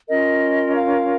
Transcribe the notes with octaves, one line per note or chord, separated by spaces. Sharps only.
C#4 F4 A#4 D#5
F5